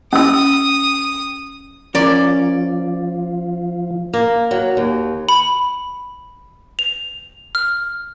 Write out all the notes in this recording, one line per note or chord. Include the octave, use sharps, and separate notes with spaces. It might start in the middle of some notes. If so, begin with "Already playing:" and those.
C#4 D#6 E6
F3 C#4 A#4 D5
A#3
F#3
D#2
B5
F7
F6